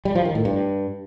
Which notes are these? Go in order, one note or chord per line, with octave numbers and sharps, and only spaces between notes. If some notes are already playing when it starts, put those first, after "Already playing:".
G3
F3
D#3
A2
G2